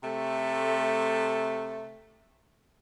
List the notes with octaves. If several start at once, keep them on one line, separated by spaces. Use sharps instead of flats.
C3 A3